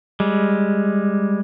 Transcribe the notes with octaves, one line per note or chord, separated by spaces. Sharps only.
G3 G#3